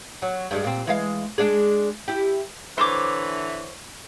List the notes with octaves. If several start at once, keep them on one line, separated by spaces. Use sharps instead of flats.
F#3
G2 G3 G#3
A#2 C4
E3 G#3 F5
G#3 D4 G#4
E4 G4
D3 E3 C5 C#5 D6